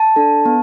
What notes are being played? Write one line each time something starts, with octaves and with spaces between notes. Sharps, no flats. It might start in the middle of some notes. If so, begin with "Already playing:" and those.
Already playing: A5
D4 A4
B3